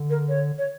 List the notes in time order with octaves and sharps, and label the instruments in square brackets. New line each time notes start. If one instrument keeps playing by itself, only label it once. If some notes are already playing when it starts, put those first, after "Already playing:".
Already playing: [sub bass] D3
[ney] A#4
C#5
C#5